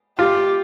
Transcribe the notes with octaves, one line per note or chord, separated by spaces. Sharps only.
F4 G4